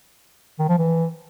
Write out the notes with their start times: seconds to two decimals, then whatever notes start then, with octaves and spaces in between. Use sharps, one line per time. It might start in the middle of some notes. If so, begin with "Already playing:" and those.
0.59 D#3
0.69 F3
0.78 E3